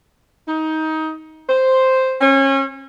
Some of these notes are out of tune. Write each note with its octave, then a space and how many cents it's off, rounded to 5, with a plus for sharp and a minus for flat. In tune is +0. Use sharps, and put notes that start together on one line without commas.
D#4 +20
C5 +0
C#4 -30